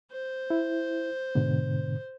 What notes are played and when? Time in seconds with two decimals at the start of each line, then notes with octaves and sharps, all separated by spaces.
0.11 C5
0.50 E4
1.35 G#2 B2 D3